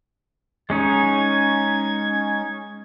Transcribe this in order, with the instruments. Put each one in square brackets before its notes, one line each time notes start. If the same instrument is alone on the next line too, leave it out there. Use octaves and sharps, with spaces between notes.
[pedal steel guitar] G#3 C#4 D#4 [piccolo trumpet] G#6